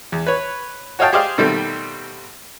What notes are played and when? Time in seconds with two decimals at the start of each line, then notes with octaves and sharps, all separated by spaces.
0.12 E2
0.27 B4 C#5
0.99 F#4 C#5 D#5 F5 G5 A5
1.13 G4 G#4 C5 D5 D#5 F5
1.38 B2 D#3 G3 A3 C4